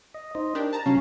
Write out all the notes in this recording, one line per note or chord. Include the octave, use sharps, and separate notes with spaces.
D#5
D#4 C5 D#5
D4 G4 A#4
A5 A#5
C3 F#3 C#4 F5